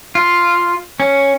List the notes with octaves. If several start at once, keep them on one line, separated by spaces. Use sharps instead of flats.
F4
C#4